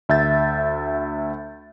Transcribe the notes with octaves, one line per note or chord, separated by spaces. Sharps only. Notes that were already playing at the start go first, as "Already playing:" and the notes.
D2 E5 G6 A6